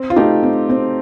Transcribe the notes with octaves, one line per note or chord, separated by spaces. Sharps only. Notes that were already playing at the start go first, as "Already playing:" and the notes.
Already playing: C4
F4
A3 D#4 G4
C4
C4